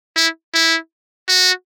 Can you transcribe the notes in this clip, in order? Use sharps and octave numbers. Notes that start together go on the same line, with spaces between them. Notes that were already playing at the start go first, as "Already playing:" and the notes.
E4
E4
F#4